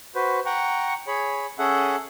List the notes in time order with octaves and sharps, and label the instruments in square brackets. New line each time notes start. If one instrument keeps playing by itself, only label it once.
[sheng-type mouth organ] F#4 B4 C5
F#5 G5 A#5 C#6
G#4 C#5 B5
C#4 G#4 A4 E5 F#5